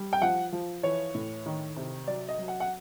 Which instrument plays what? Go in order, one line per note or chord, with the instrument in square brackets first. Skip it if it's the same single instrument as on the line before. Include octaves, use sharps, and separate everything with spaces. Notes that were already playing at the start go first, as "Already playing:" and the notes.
Already playing: [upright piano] G3
G5
F3 F#5
F3
E3 C#5
A2
D#3
C3
F#3 D5
D#5
F#3
F#5
F#5